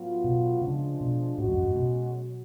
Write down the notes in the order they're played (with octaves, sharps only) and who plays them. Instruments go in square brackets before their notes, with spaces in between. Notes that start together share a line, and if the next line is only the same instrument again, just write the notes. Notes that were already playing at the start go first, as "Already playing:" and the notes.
Already playing: [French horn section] A2 F#3 B3 F4
[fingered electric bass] B2
[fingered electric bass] C#3 [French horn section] F3 G#3 D4
[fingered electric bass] B2
[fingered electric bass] A2 [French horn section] G#3 C#4 F#4
[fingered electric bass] F2
F#2
G#2
B2
[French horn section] F#3